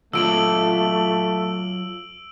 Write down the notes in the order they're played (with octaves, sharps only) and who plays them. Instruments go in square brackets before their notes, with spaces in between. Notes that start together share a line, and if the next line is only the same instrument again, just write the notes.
[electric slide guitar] F#3 F4 A4 [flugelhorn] A3 [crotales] E6 D7 F#7